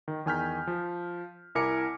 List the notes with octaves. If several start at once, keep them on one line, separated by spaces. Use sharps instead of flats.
D#3
E2 D#3 G#5 F6 G6 B6
F3
C2 E4 A#4 G#5 D6 C#7